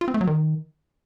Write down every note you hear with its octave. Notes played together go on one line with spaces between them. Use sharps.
F4
C4
A3
F#3
D#3